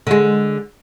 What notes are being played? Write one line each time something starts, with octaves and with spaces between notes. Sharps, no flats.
D3 G#3